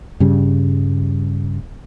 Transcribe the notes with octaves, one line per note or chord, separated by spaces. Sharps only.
G2 C#3 G3